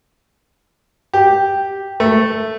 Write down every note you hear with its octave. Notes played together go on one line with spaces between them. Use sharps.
G4
A3